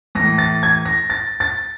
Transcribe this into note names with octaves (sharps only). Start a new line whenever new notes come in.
A2 E3 A#6
A6
G#6
A#6
A6
A6